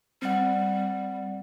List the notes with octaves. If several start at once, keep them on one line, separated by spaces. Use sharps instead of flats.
G3 C4 F#5